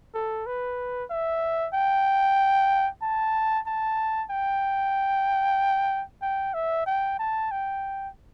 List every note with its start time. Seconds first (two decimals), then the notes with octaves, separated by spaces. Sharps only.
0.14 A4
0.47 B4
1.10 E5
1.74 G5
3.02 A5
3.66 A5
4.30 G5
6.22 G5
6.54 E5
6.86 G5
7.19 A5
7.51 G5